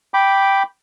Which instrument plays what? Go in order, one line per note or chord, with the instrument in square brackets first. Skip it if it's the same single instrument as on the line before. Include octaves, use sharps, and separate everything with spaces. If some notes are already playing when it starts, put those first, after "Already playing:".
[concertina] G5 B5 D6